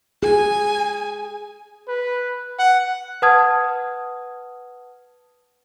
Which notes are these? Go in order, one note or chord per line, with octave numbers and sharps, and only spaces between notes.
G#4 G#5
B4
F#5
B4 F#5 A5 D#6 F6 G#6